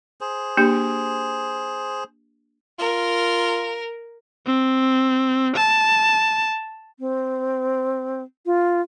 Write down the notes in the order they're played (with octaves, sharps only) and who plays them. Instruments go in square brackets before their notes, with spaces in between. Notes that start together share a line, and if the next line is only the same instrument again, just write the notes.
[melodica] G#4 C5
[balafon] A#3 D4 G4
[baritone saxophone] F4 [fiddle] A#4
[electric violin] C4
A5
[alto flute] C4
F4